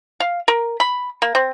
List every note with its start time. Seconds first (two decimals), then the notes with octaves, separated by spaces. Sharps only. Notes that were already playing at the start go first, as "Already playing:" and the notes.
0.20 F5
0.48 A#4
0.80 B5
1.22 A#3
1.35 C4